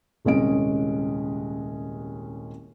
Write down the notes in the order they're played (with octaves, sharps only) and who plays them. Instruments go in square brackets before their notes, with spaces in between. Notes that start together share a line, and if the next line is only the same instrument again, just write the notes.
[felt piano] D#1 C2 G#3 C#4 D#5 D7